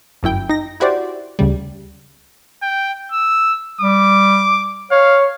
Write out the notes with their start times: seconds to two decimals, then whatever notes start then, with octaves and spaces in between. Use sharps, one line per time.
0.23 G1 F#2 E4 G5
0.49 D#4 A#6
0.80 E4 F#4 G4 C5 D5
1.39 D2 C#3 G3
2.63 G5
3.12 E6
3.81 G3 D6
4.91 C#5 F5